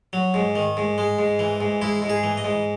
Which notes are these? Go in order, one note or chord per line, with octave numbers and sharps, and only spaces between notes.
F#3
G#2
D#3
G#2
G#3
G#2
E3
G#2
G#3 E4
G#2
G#4
E3
D#5
G#2